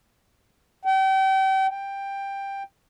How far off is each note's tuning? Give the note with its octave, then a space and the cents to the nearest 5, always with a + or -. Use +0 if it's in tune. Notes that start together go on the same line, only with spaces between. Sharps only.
G5 -35
G5 +10